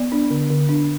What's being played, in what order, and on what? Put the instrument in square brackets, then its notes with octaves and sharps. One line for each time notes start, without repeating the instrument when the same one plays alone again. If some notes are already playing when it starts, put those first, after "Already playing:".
Already playing: [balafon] B3 D5
D4
D3
D3
D4